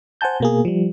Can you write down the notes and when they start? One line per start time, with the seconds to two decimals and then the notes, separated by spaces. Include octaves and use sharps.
0.21 C5 F#5 G#5 A5 G6
0.40 B2 A#3 G#4
0.65 F3 G3